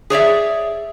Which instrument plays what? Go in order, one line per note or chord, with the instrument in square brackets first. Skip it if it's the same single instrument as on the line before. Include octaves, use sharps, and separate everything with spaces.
[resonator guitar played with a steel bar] G#4 C#5 D5 E5